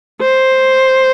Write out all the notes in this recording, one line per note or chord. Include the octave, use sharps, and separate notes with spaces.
C5